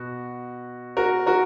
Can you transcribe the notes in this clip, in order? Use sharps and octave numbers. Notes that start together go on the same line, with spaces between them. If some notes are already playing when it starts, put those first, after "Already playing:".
Already playing: B2 F#4
F#4 A#4
F#4 A#4